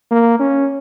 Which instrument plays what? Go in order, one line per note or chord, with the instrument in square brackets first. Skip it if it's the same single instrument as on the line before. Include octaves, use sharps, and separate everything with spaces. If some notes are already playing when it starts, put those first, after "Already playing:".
[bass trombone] A#3
C#4